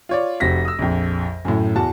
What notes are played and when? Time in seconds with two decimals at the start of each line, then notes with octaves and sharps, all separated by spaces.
0.09 F4 C#5 D5
0.40 F1 C4 F#4 A#6 B6
0.65 D#6 E6
0.79 A#1 F2
1.45 F#2 A2
1.76 E2 F#4 A5